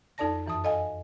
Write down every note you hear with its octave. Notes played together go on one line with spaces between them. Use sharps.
F2 D#4 A4 D5 A5 A#6
F#2 E3 A5 D#6
A4 D#5 F5 G#5